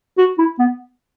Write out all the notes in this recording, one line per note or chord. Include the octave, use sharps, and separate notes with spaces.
F#4
E4
B3